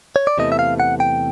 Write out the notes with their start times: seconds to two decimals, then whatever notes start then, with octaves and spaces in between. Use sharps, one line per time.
0.16 C#5
0.27 D5
0.38 E2 C3 E3 A3 D#5
0.52 E5
0.59 F5
0.80 F#5
1.00 G5